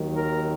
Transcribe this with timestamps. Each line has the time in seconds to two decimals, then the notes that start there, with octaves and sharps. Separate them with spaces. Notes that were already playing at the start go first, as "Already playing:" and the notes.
Already playing: D#2 D#3 F#3
0.16 A#4